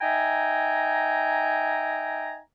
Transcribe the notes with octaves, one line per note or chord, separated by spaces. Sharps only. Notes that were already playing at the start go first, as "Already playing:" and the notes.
D#4 E5 G5 G#5 A#5